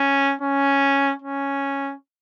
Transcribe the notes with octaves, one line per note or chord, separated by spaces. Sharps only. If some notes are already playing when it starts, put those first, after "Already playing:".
Already playing: C#4
C#4
C#4